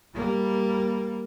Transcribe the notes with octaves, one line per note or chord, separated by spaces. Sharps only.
G3 A#3